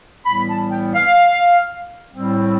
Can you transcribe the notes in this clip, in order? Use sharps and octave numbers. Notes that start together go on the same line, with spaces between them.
A2 E3 G3 B3 B5
A5
G5
F5
A2 G3 C4